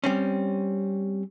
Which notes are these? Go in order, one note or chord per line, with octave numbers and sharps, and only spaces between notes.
G3 C4 C#4